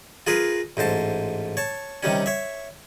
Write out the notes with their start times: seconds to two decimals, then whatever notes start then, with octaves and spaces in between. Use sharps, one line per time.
0.27 F4 G#4 A#4 B4
0.77 A1 G#2 C5 A5
1.57 C#5 A5
2.03 C3 D#3 G3 C#4
2.26 C#5 E5